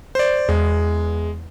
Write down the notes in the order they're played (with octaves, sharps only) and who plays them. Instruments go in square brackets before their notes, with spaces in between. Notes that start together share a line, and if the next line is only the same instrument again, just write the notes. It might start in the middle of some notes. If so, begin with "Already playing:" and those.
[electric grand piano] C5 D5
[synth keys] E2 [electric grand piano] G#3